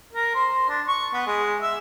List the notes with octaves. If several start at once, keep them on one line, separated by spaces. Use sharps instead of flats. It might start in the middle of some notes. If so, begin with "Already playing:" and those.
A#4
C5
D4
C#6
B3
G#3
E5